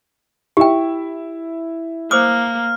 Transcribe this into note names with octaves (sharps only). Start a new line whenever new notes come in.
E4 G4 E5 G5
A#3 C5 D6 D#6 F6